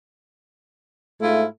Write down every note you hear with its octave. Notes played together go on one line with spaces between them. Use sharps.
G#2 A3 E4 F4